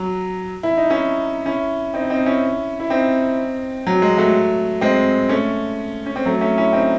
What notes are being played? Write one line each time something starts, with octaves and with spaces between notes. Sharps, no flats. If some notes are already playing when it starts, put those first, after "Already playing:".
Already playing: F#3
E4
D#4
C#4 E4
C#4 E4
C4 D#4
C4 D#4
C#4 E4
E4
C4 D#4
F#3
G#3
F#3 A3
G#3 C4
A3 C#4
C#4
C4
F#3 A3
A3 C#4
C#4 E4
C4 D#4